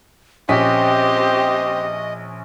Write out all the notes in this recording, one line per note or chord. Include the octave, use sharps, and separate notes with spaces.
A#1 C4 C#4 G4 D#5 B6